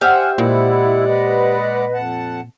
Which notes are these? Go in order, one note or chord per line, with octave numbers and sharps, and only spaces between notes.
G4 C5 E5 F#5 G#5 F6
A#2 G#3 E4 D5 F#5
B4 D#5
F2 F#5 A5